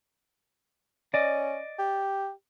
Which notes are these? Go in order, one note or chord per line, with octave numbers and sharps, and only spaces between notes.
C#4 D5 D#5
G4